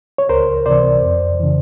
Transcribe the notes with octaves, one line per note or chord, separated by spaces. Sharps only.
C#5
C#2 A#4 C5
C3 E3 C5 D5
F2
C#3 E3